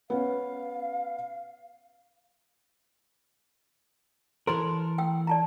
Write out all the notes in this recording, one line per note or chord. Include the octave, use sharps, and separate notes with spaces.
B3 C#4 F5
E3 A4 A#4 C5 C6
G5 E6
D5 A5 A#5